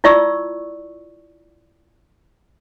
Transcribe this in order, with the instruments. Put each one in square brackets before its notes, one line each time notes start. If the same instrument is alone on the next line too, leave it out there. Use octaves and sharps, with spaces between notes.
[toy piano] E4 F4 D5 C#6 E6